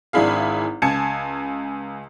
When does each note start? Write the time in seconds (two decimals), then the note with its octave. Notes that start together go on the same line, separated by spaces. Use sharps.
0.13 G#1 D4 E4 G#4 F5
0.82 C#2 G#5 A5 G#6 C#7